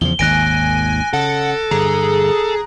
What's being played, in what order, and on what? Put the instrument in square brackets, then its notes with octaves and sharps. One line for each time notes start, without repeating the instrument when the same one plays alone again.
[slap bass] E2 C#3 F3 [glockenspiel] G7
[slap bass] G#1 D#2 [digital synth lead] G#5 [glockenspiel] F#6 A#6 D7
[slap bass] C#3 [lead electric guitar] A4 [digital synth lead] F#5
[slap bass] G2 D3 [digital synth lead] G#4 [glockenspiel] A#5